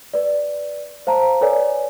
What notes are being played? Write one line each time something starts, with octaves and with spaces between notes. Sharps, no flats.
B4 D5
C5 F5 A5 A#5
A4 B4 C#5 D5 G#5